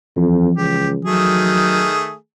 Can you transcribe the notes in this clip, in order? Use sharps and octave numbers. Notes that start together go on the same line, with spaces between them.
F2 E3 F3
C#2 G4
D#3 F#3 A3 G#4